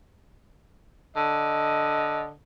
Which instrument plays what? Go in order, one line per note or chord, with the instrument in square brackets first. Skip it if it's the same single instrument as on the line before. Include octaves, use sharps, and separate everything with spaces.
[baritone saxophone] D3 [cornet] D#5